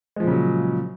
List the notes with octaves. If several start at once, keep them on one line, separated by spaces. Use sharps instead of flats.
A#2 C#3 F3 F#3 G#3